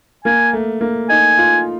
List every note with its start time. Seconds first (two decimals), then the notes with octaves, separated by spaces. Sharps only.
0.25 A#3 G#5
0.53 A3
0.81 A#3
1.09 D#4 G#5
1.38 F4